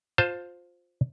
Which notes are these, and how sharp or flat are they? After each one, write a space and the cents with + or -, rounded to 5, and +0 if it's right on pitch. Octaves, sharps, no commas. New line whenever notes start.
F4 +15 C5 +0 A5 +10